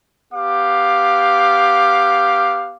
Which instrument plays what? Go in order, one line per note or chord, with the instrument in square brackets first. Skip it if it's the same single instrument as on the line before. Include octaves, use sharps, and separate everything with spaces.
[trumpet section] B3 G4 F5 D6